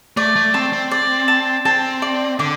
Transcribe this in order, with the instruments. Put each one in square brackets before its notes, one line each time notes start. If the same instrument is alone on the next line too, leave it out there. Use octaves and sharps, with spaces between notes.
[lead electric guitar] A3 [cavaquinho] D5
[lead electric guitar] A3
[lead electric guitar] C4 [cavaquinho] A5
[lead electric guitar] C4
[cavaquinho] D5
A5
[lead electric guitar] C4 [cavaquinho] A5
[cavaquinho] D5
[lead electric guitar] D3 [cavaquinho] D6